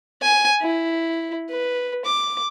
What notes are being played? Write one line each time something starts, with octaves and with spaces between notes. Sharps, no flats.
G#5
E4
B4
D6